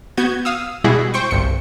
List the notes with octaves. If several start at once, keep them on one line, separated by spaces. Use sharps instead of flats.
B3 F#4 G6 G#6
F5 D#6 E6
B2 G3 G#3 E4 F#4 G#4
C5 G5 C#6
G1 C2 C#7